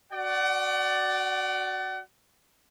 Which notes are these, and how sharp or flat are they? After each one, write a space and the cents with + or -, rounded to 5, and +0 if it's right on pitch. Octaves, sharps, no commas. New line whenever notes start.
F#4 +0 D5 +5 F#5 +40